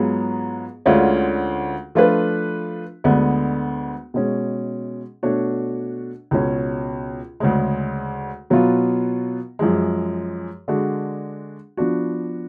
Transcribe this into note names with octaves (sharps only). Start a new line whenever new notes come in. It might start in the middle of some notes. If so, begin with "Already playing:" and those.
Already playing: G#2 F#3 B3 F4 G#4
D2 D3 G#3 C#4 F4
F3 A3 D4 F4 B4
D2 D3 G#3 B3
B2 G#3 C#4
B2 A3 D4 F#4 C#5
C#2 B2 G#3 C#4
D2 C#3 G#3
B2 F#3 B3 F4
F#2 F3 G#3
D3 G#3 D4 F#4
F3 B3 D4 F#4